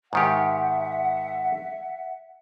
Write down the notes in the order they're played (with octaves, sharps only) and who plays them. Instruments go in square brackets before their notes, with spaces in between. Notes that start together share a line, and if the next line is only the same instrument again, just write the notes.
[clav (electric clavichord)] G#2 D#3 G4 [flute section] E5 F#5